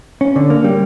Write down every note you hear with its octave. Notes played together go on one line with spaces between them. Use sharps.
C#4
D3
A#3
G3